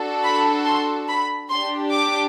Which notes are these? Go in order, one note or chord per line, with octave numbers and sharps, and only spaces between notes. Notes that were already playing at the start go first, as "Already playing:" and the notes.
Already playing: D4 F#4 A4
B5
C6
B5
D4 G4 C6
D6